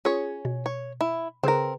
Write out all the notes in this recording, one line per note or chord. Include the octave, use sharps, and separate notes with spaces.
C#4 F4 G#4 C#5
B2
C#5
E4
C#3 C4 G#4 A#4 B4